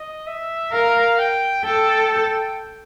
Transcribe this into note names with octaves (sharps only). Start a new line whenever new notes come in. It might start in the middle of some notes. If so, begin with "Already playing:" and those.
Already playing: D#5
E5
A#4 F5
G5
A4 G5
G5